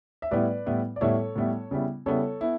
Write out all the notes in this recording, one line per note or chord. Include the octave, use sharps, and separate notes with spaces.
E5
A2 G3 B3 E4 B4 D5
A2 G3 B3 E4
D5
A2 G3 B3 E4 A4 C#5
A2 G3 B3 E4
C#3 G3 B3 E4
C#3 G3 B3 E4 A4 C#5
B3 E4